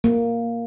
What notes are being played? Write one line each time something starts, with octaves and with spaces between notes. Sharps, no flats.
A#3